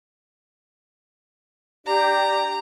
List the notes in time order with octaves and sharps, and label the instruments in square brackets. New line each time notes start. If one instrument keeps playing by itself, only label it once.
[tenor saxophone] D4 [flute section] G4 [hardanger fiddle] A#5